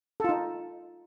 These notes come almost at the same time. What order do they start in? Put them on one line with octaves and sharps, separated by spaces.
A4 F4 D#4